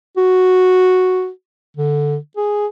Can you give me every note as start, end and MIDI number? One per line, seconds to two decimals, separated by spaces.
0.17 1.29 66
1.77 2.16 50
2.37 2.66 68